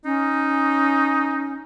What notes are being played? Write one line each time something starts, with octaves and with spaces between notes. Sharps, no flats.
C#4 D#4